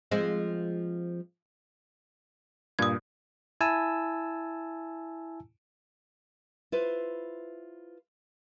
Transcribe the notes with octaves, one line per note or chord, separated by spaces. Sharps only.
F3 G#3 C4
G2 A#2 D#6 G#6
E4 G#5 A5 E6
E4 F4 B4 C5